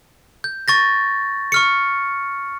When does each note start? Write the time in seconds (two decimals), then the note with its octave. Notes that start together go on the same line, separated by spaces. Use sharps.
0.44 G6
0.68 C#6 A6 A#6
1.52 C#6 F6 C#7